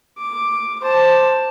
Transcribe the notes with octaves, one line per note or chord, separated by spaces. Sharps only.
D6
C5 A5